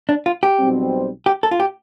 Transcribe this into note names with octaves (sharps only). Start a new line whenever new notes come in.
D4
F4
G4
B1 B2 G3 C4
G4
A4
F4
G4